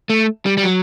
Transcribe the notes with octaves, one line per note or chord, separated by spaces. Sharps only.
A3
G3
G3
F#3